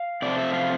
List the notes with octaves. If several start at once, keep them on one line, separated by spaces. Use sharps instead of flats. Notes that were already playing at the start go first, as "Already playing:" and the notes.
Already playing: F5
C3 F3 A3 D5
E5
F5